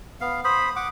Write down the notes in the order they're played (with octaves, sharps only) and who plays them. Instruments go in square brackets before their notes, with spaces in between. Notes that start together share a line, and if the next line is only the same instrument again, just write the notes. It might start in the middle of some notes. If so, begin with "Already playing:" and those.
[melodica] B3 F5
[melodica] C5 B5 [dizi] D#6
[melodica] F#5 D6